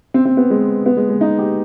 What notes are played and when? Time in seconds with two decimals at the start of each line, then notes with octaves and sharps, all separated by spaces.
0.14 C4
0.25 C4
0.37 B3
0.50 G#3
0.86 B3
0.97 G#3
1.09 G#3
1.21 D#4
1.38 G4